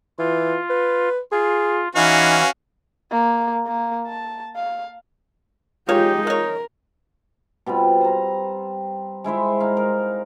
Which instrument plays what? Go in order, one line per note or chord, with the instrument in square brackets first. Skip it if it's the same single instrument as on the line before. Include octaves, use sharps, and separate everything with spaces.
[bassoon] E3 [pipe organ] F4
[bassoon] B4
[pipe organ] F4 [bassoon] G#4
[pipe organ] E3 [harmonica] C#4 F#4 F5 [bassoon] D#4
[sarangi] A#3
A#3
A5
F5
[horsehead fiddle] G#3 G4 [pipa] A#3 C#5 [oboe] D#4 [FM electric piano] F4
[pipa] G#3 C#5 [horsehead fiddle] A#4
[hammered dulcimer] B2 G3 C4 F4
C5 A#5
G#3 E4 C5 E5
D#4 F5
A#4